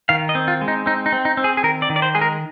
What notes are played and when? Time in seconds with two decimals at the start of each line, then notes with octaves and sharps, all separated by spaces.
0.09 D#3 F5
0.29 D#5
0.35 C4
0.48 F4
0.61 G#3
0.68 D#4
0.86 C4 D#4
1.06 D#4
1.12 C4
1.25 D#4
1.37 C4
1.44 G#4
1.57 G#4
1.63 D#3 A#4
1.82 D5
1.90 D#3
1.96 D5
2.02 C5
2.15 G#3 G#4
2.21 A#4